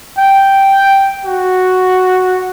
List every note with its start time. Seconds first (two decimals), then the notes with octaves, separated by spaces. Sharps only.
0.18 G5
1.25 F#4